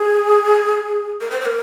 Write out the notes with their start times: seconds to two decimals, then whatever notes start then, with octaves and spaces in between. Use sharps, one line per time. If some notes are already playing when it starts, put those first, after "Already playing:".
Already playing: G#4
1.21 A#4
1.31 C5
1.41 C5
1.45 A#4